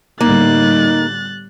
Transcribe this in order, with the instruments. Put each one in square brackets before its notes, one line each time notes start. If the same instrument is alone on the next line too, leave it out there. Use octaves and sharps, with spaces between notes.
[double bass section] A2 D3 G3 [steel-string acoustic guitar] A#3 [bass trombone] D#4 [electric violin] F#6 A6